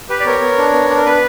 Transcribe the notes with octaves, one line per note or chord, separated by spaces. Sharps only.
G4 B4
D5
B3 A#4 C#5
B3
D4
B3
D4
A#4
B3 B4